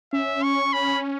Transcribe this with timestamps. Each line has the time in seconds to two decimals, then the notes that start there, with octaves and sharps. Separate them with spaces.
0.13 C#4 E5
0.43 C#6
0.73 B5